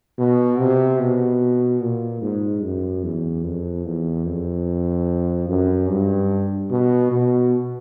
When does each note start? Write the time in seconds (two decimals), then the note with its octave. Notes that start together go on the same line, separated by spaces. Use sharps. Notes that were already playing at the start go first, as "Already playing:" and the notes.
0.18 B2
0.59 C3
1.00 B2
1.82 A#2
2.22 G#2
2.63 F#2
3.04 E2
3.45 F2
3.85 E2
4.26 F2
5.49 F#2
5.89 G2
6.71 B2
7.12 B2